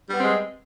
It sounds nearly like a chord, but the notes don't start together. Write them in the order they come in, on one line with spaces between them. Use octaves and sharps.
G3 B3 C4 G#3